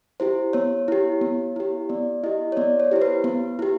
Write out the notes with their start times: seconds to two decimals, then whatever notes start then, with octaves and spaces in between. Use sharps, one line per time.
0.20 E4 G4 C5
0.53 B3 C#5
0.88 E4 G4
1.21 B3
1.56 E4 G4
1.89 B3 D5
2.23 E4 G4 D#5
2.52 C#5
2.57 B3 D5
2.80 C#5
2.91 E4 G4 C5
3.02 B4
3.24 B3
3.59 E4 G4